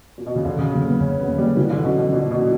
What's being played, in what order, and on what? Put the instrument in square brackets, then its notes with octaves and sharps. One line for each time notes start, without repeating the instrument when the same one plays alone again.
[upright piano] A#2
B2
C#3
[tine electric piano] E2 [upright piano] D3
[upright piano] C#3
[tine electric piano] D3 F#3 A#3
[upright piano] B3
[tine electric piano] E2 [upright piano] C#4
[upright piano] B3
[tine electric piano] D3 F#3 A#3
[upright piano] G3
[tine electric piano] C#3 [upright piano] E3
[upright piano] D3
[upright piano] B2 [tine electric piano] F#3 C#4 E4
[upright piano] B2
[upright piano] A#2 [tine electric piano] C#3
[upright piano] B2
[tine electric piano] F#3 C#4 E4